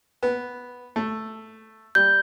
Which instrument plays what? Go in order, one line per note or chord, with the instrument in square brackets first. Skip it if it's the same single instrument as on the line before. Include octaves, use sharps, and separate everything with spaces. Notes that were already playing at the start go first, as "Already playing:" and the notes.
[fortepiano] B3
A3
[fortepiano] G3 [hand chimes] G6